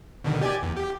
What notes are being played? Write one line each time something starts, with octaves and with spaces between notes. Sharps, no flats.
B2 D3 D#3
G4 D5 G#5
E2
G4